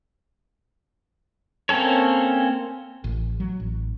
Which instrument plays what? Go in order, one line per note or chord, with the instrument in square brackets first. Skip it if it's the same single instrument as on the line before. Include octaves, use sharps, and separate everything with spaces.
[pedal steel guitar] A#3 C4 C#4 A4 C#5
[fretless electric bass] A1
F#3
A1